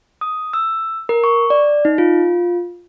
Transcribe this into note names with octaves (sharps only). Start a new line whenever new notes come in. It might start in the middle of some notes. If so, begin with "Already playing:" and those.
D#6
E6
A#4
C#6
D5
D#4
F4